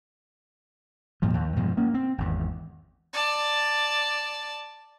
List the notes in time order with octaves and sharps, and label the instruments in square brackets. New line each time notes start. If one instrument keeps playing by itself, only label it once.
[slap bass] G2 A#2 F3
D#2
G2 B2 F3 G#3
A#3 C#4
C4
G#1 E2
[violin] D5 A5